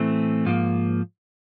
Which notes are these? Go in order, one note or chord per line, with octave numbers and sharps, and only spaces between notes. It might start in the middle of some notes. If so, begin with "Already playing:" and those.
Already playing: A2 E3 A3 C4
G#2 F3 A#3